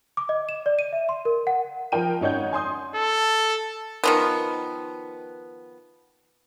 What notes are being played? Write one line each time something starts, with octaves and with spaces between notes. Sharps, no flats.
D6
D#5
E7
D5
D#7
E5
C6
A#4
F#5
F3 A#4 G5 D#7
G#1 F#2 D#4 C#5 F#5 G6
G#5 C6 D#6 G6
A4
D#3 F3 B3